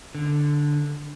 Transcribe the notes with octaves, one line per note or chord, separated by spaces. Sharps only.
D3